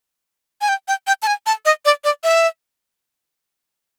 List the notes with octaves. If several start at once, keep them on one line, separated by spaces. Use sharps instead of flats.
G#5
G5
G5
G5
A5
G#5
A5
D#5
D5
D5
E5